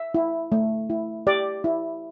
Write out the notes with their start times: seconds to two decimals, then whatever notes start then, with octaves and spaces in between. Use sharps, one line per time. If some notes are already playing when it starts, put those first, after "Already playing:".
Already playing: E5
0.14 E4
0.52 A3
0.90 E4
1.27 G4 D5
1.64 E4